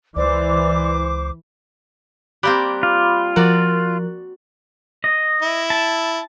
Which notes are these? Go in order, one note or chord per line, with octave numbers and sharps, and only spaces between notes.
C#2 E3 C5 D5 D6
G3 A#3 C4 B5 D6 F#6
F4
F3 F#4 A#4 D5 F#6
D#5
E4
A5